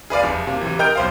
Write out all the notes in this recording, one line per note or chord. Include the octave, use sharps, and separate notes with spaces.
G#4 B4 D5 F5
F1 F2
C3 A#3
C3 E3
A#4 D#5 G5 A#5 F6 G6
B1 C5 F5